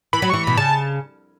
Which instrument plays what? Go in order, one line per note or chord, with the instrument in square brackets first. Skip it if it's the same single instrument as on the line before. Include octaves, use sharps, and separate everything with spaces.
[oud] E3 [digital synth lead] B5
[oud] F#3
[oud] E3 [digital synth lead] C#6
[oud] B2 [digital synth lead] B5
[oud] C#3 [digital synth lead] A5